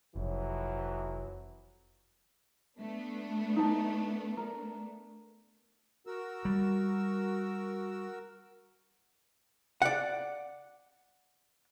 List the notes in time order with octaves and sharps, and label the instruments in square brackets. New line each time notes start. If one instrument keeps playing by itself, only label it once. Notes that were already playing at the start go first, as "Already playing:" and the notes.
[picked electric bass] F1 [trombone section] F2 E3 F#3
[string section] A3 B3 D4
[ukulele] D#4 A5
A#4
[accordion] F#4 A#4 E6
[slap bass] G3
[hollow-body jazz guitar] D5 F#5